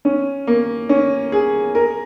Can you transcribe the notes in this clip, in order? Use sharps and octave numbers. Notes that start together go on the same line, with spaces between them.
C#4
A#3
C#4
G#4
A#4